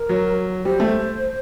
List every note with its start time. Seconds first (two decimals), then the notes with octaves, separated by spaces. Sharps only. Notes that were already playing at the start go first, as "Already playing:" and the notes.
Already playing: A#4
0.09 F#3
0.65 G3 C5
0.80 A3